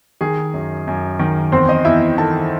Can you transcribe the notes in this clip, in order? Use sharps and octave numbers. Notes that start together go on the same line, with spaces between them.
D#3 G#4
F#2
F#2
D#3
E2 C4 C5
D#4 D#5
E2 E4 E5
D#3 A4 A5